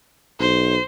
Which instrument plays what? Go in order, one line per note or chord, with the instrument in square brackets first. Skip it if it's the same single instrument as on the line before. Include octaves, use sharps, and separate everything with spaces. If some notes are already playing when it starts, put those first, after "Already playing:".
[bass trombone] B1 [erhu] C5